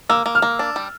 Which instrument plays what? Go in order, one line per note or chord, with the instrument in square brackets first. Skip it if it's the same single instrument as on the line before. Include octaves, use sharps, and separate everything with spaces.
[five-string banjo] A#3 [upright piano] E6
[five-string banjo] A#3
[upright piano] F6
[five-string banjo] A#3
D4
G3